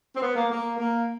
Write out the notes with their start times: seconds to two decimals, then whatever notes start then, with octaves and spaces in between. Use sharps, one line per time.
0.16 C4
0.21 B3
0.36 A#3
0.50 A#3
0.78 A#3